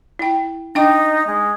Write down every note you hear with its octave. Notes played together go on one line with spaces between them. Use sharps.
E4 G5
D4 D#4 G5 D6
G#3